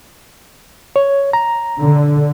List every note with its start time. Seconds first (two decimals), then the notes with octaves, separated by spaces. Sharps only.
0.96 C#5
1.33 A#5
1.80 D3